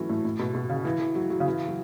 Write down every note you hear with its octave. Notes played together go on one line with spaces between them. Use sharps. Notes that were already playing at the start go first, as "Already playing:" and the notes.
Already playing: E3 F#3 A3 C#4
A2
A2
B2
B2
C#3
E3
E3
F#3
F#3
C#3
E3
F#3